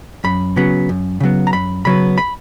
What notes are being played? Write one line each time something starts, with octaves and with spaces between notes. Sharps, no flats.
F#2 B5
C#3 F#3 B3
F#2
C#3 F#3 B3
A#5
F#2 B5
C#3 F#3 B3 B5
B5